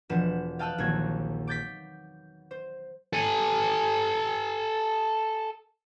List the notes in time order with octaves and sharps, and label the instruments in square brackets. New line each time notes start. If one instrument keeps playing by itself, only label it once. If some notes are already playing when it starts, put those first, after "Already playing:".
[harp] E1 F3 B4 F#5 E7
F5 G5 A5 D#6 E6 F#6
A#1 D#2 F#3 C4 G#6
D6 G6 A6 B6
C5
[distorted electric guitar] A4 G#5